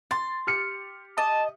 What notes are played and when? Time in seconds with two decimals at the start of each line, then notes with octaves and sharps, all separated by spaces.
0.11 C6 A6
0.47 G4 F6 C#7
1.18 D#5 A5